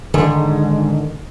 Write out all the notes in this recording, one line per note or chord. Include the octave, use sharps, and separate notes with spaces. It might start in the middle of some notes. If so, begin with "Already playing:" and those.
G#2 D3 D#3